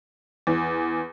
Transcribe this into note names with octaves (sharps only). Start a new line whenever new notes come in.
E2